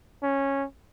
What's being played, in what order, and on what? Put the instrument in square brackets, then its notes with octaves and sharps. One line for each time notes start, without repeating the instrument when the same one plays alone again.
[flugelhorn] C#4